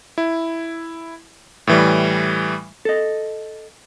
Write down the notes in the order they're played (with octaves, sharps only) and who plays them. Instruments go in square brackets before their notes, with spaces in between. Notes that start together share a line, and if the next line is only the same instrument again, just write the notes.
[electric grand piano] E4
A2 E3 G3
[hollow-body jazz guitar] A4 D#5